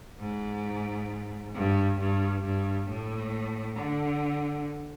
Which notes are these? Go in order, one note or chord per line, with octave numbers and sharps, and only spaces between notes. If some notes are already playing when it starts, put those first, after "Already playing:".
G#2
G2
G2
G2
A2
D3